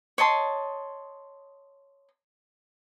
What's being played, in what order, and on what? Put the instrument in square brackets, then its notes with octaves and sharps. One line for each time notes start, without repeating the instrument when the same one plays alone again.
[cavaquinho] C#5 D#5 A5 C6